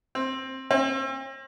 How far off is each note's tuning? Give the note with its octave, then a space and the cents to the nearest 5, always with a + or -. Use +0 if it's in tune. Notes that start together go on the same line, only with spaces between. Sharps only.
C4 +15
C4 +45